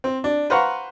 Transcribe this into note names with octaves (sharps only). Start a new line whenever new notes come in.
C4
D4
B4 C5 F5 F#5 A#5 C#6